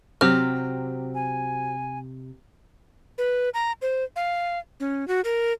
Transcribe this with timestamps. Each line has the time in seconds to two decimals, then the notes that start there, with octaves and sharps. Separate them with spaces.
0.21 C3 F#3 C4 G4 F6
1.14 G#5
3.18 B4
3.54 A#5
3.82 C5
4.16 F5
4.80 C#4
5.08 F#4
5.24 A#4